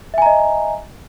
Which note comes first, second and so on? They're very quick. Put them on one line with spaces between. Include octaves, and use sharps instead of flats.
E5 G#5 A#5 D#5